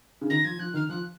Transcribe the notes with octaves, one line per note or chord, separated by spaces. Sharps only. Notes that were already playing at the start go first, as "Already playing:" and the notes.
C#3
D#3 A#6
F3 G#6
F3 F#6
D#3 F6
F3 F#6